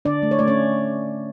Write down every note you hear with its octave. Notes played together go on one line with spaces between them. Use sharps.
D3 D4 D5
A3
C#5
A3 D5
C#4 C#5